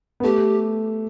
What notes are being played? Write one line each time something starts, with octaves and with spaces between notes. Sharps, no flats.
B3
A3 G4